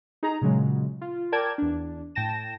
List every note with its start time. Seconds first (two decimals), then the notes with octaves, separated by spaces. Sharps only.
0.23 D#4 G#4 A#5
0.42 A#2 C#3 F#3 G#3
1.01 F4
1.32 A#4 D5 G5 A5 D6 G#6
1.58 E2 D4
2.15 A2 G5 A5 A#6 E7